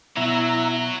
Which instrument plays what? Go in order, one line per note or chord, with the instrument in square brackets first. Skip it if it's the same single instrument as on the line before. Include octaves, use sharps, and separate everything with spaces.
[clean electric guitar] B2 [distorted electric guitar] F#3 [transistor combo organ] E4 E5 A#5